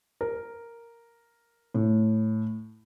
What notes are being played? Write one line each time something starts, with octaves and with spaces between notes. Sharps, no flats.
A#4
A2